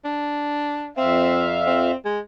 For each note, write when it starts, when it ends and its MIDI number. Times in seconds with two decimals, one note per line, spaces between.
0.05 0.88 62
0.97 1.91 41
0.97 1.46 60
0.97 1.91 76
0.97 1.91 77
1.67 1.96 60
2.05 2.20 56